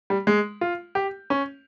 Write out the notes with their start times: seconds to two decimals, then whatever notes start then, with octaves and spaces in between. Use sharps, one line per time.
0.10 G3
0.27 G#3
0.61 F4
0.95 G4
1.30 C#4